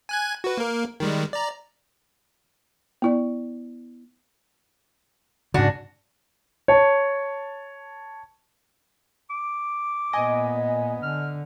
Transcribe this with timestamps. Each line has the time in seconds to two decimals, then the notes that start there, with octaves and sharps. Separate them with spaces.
0.09 G#5 F#6 G#6
0.44 F#4 B4
0.57 A#3 A#4
1.00 D#3 G3 G#3
1.33 D5 A#5
3.02 B3 E4 D5
5.54 G#2 C#3 D4 F#4
6.68 C#5 A5
9.30 D6
10.13 A#2 B3 D#5 G#5
11.03 D3 F6